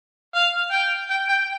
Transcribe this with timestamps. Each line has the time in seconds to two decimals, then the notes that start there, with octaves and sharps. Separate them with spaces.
0.35 F5
0.72 G5
1.10 G5
1.29 G5